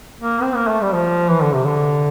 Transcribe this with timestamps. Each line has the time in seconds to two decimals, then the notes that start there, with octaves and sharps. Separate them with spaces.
0.21 A#3
0.42 C4
0.55 A#3
0.68 A3
0.82 G3
0.94 F3
1.30 E3
1.43 D3
1.55 C3
1.66 D3